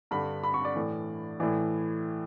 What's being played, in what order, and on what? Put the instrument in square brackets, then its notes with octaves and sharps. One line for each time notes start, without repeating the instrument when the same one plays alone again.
[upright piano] G2 D3 B5
B5
C#6
D5
A2 E3
A2 E3 D5